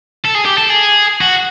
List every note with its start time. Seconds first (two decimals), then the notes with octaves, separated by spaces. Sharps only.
0.25 A4
0.35 G#4
0.45 G4
0.58 A4
0.70 G#4
1.21 F#4